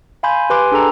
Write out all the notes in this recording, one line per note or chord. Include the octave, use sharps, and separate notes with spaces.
F5 G#5 B5 C6 G6
G4 B4 G#5 C6 D6
D4 G#4 A4 G5 A#5